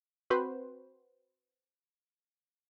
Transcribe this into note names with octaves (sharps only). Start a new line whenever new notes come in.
C4 F#4 B4 C5